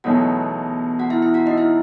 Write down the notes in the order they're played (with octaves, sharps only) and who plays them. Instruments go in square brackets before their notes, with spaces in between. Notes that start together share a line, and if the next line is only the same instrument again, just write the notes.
[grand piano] E2 B2 F#3 A3 D#4 [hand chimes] F#4 F#5
[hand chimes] F#4 F#5
E4 E5
E4 E5
F#4 F#5
D#4 D#5
E4 E5